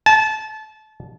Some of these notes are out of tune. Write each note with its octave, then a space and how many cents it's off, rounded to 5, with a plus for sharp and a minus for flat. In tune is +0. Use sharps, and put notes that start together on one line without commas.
A5 -25